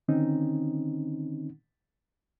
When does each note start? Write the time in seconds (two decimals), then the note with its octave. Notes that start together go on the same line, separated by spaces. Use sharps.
0.08 D3 D#3 C4 C#4 D#4